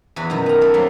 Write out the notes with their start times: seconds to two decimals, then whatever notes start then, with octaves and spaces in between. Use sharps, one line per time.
0.16 E2 E3 F#4 B4
0.30 F#2 B2 D#3
0.46 B3 A#5
0.61 A3 A4
0.74 F#3 A3 A#3 C4